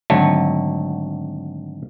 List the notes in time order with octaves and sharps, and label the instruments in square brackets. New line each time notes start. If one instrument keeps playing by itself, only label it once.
[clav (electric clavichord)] G#1 D3 F#3 A3